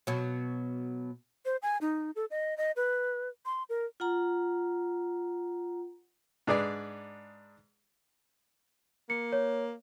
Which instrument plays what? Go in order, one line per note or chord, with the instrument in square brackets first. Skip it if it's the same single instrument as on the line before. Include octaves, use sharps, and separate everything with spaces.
[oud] B2 F#3
[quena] C5
G#5
D#4
A4
D#5
D#5
B4
C6
A#4
[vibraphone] F4 F#5 A#5
[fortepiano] G#2 D4 G#4 B4 D5
[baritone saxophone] A#3 [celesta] C#7
[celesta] C#5